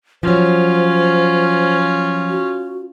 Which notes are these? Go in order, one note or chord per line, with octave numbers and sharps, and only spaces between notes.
F3 F#3 C#4 F4 C5
F#4